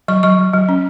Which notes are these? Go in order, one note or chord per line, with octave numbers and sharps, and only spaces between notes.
F#3 C#6
F#3 C#6
F#3
F#3
C#4